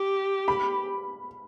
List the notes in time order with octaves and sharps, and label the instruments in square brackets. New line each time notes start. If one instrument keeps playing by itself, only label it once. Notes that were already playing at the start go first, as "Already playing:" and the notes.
Already playing: [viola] G4
[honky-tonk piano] B5